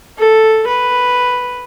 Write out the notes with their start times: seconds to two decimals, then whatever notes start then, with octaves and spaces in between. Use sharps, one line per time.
0.18 A4
0.67 B4